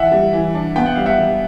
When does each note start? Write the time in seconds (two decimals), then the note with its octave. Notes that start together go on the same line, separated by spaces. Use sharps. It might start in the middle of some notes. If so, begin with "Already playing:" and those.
Already playing: E3 E5 F#5
0.12 G3
0.33 E3
0.55 D4
0.76 B3 G5
0.86 F#5
0.95 G3 F5
1.06 E5 F#5
1.18 G3